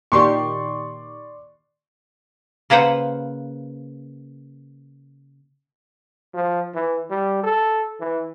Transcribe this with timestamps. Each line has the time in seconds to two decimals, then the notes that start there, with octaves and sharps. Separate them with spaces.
0.12 A#2 D#3 G4 D5 C6 C#6
2.70 C#3 A#3 B4 C5 F#5
6.34 F3
6.75 E3
7.10 G3
7.43 A4
8.00 E3